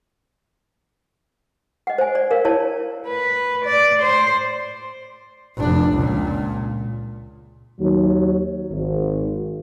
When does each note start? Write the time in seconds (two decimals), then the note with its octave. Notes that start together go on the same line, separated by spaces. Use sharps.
1.87 D#5 F#5
1.98 C5 G#5
2.15 D5
2.31 A#4 F5
2.45 E4 C#5 D5 A5
3.08 B4
3.65 D5
4.02 C5
5.57 F1 D4
5.93 C#2 A#2
7.80 D#2 F#3
8.71 G#1